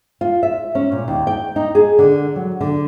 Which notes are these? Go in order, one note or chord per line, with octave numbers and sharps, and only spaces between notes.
F4
E5
C#4
A#2
D#2
G5
D#4
G#4
D3
F#3
D3